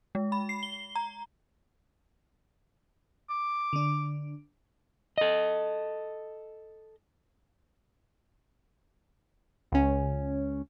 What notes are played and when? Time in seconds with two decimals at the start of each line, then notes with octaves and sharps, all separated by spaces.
0.15 G#3
0.32 B5
0.49 C7
0.63 G7
0.95 A#5
3.30 D6
3.73 D3 D4
5.18 A4 D#5
9.72 C#2 C#4